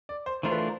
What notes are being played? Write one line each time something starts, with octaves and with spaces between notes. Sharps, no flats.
D5
C5
E3 A3 D4 F4 A#4 C5
B4
C5